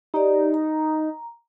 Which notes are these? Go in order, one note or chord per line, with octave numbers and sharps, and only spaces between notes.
D#4 G4 D5
A#5